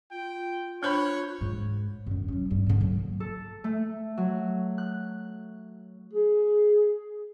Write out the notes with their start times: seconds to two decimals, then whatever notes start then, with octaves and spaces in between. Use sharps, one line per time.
0.11 F4 G5
0.83 D4 C5 C#5 B5 F#6 G6
1.41 G#2
2.06 F#2 D3
2.28 F#3 C#4
2.51 G2 G3
2.66 G#2 D3
2.81 F#3 A#3
3.20 A4
3.64 A3
4.17 F#3
4.78 F#6
6.13 G#4